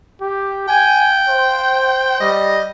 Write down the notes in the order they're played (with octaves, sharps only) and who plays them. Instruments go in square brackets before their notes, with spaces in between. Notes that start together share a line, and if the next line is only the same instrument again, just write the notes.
[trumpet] G4
[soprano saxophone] G5 [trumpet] G#5
[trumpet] C5
[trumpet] G3 [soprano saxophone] D#5